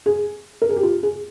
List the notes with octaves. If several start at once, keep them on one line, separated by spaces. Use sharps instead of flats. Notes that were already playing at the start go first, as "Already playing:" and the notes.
G#4
A#4
G#4
G4
F4
G#4